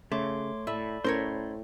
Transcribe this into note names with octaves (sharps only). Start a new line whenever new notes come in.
C#3 A3 C#5 C6 D6
A2 A4 D5 E5 B5
A2 C#4 A#4 C5 C#5